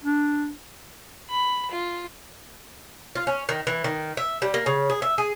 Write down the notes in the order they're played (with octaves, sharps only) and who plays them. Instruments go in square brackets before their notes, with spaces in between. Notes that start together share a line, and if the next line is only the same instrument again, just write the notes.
[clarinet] D4
[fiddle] B5
F4
[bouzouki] F4
C#4
D#3
E3
D#3
E5
G3
A#3
C#3
G#4
E5
G#4